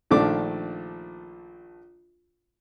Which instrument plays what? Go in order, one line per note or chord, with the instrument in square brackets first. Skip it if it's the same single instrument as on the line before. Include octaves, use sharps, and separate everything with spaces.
[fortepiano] A#1 D#3 F3 A3 D4 D6